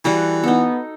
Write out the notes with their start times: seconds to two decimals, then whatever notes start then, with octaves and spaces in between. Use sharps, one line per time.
0.05 E3 G3 F#4 A4
0.44 B3 D#4 A4